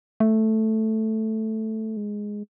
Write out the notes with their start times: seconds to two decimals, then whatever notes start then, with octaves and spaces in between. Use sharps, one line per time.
0.20 A3
1.97 G#3